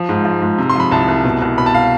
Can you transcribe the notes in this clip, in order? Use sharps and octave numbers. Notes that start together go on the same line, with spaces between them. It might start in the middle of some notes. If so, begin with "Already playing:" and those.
Already playing: F3
G#2
F3
G#2
C3
C6
F3 B5
C2 A5
C2
B2
C2
B2 B5
A5
F5